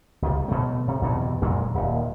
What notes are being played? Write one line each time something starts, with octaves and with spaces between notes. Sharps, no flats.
F1 C#2 G3
B2 A3
C3
E2 G2 B2 D3
F2 A#2 F#3 G#3
D#1 D#2